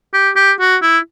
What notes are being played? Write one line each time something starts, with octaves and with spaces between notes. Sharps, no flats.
G4
G4
F#4
E4